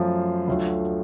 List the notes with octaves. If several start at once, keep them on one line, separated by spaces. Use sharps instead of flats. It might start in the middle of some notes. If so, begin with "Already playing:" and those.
Already playing: F#2 F3 A3 F4
D2 D3 F#3 A3 F4